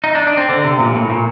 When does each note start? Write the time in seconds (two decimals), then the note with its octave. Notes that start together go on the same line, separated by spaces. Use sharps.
0.04 D#4
0.15 D4
0.27 D4
0.37 C4
0.49 D3
0.64 C3
0.79 A#2
0.95 A2
1.10 A#2